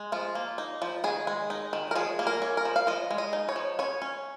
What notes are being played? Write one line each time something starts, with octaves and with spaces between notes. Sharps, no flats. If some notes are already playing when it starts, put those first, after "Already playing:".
Already playing: G#3
F3 F4
A#3
D#4
F3
D#3 G#4
G#3
D#4
D#3
A#4
F3 G#4
A#3
A#4
C#4
A#4
F3
F5
F3 D#5
G#3
D#5
D#4
C#5
F3
C#4 C#5
C#4